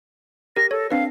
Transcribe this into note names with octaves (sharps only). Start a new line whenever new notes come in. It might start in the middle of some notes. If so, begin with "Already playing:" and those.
G4 A#4 A#6
A4 C#5
C4 D4 B4 F5